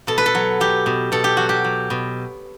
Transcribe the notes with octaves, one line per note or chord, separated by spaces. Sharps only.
B2 A4
B4
A4
F#3
F#3 G4
B2
B2 A4
G4
F#3 F#4
G4
F#3
B2